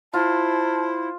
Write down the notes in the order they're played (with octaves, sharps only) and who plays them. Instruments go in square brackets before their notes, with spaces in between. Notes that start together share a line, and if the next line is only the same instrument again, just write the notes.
[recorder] E4 [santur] F4 [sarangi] C5 [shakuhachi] A5